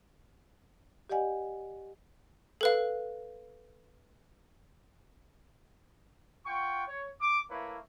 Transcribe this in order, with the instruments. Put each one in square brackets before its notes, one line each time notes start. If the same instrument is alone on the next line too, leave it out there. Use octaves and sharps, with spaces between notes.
[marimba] G4 D5 D#5 F#5 G#5
[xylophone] A4 B4 F5
[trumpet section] F4 F#5 G5 C#6
C#5
D6
A3 A#3 E4 B4 C#5